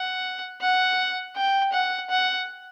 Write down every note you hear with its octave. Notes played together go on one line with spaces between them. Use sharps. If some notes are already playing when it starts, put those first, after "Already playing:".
Already playing: F#5
F#5
G5
F#5
F#5